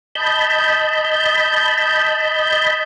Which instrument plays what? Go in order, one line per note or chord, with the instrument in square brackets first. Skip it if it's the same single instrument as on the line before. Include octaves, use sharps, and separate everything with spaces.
[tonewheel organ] D#5 A5 B5 G6